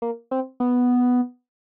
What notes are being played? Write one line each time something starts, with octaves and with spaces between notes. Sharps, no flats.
A#3
C4
B3